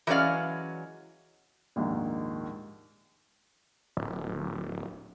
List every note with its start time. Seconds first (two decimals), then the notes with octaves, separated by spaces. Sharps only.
0.07 E3 F#3 G#3 C#4 D5 F5
1.76 A#1 D#2 G#2
3.97 D1